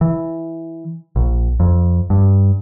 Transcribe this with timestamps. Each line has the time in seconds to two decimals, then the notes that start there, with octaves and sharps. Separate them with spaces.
0.01 E3
1.16 A#1
1.60 F2
2.10 G2